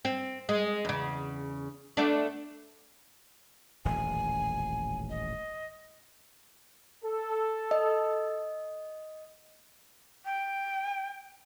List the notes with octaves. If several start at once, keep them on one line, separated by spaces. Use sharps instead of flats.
C4
G#3
E2 C#3
A3 B3 D4
D#1 A1 F2 G#5
D#5
A4
D#5
G5